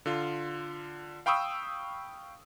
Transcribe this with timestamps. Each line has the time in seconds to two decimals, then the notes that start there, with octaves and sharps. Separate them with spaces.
0.06 D3 F4
1.26 F5 G5 B5 C#6 D#6 E6